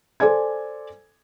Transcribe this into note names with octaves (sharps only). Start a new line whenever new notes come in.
A4 C5 D5 G#5 G#6